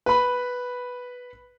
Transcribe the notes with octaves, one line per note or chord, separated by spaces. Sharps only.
B4 B5